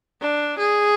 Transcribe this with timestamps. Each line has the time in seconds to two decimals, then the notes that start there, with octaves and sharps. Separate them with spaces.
0.21 D4
0.58 G#4